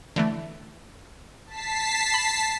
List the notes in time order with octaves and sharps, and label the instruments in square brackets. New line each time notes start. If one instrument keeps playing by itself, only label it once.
[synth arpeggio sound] D3 E3 A3
[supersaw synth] A5 B6 C7
[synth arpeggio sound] B5